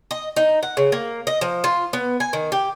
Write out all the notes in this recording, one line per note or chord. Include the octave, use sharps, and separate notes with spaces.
D#5
D#4
F#5
C#3
A#3
D#5
F3
F4
B3
G#5
D#3
G4